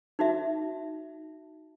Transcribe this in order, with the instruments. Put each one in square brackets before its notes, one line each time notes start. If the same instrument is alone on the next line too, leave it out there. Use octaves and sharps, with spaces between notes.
[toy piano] D#4 F#4 E5